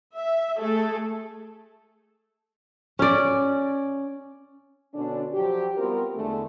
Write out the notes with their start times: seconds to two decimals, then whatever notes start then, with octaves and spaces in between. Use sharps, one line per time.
0.13 E5
0.57 A3 G#4 A4
2.99 C#4 D5
4.93 B2 D3 C#4 D4
5.33 F3 F#3 G4
5.77 G3 B3 C4 F4 A#4
6.15 E2 D3 G#3 A3